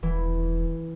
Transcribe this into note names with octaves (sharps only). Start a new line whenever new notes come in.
E1 E3